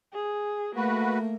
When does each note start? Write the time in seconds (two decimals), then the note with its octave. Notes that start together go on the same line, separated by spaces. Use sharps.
0.14 G#4
0.76 A3 A#3 F#4 B4